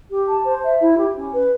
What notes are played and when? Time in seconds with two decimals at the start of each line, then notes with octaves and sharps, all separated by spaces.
0.09 G4
0.27 A5
0.44 C5
0.63 E5
0.80 E4
0.97 G4
1.15 C#4
1.33 B4